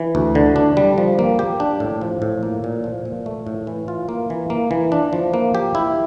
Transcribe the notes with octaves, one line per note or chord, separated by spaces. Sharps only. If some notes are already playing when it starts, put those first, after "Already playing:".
Already playing: E3
D2
D3
D4
G3
F3
A#3
G4
D4
A2
F3
A2
A#3
A#2
F3
A#2
A3
A2
E3
F4
A#3
E3
A#3
E3
D4
F3
A#3
G4
E4